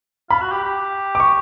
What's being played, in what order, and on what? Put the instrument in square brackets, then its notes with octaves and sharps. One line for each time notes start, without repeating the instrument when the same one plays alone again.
[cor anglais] F4 [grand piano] B5
[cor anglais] F#4
G4
G4
[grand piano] D6
C#6